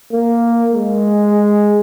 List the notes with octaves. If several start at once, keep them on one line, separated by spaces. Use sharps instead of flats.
A#3
G#3